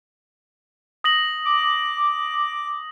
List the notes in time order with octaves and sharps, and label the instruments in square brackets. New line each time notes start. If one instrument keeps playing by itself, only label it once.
[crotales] D#6 A#6 F#7
[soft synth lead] D6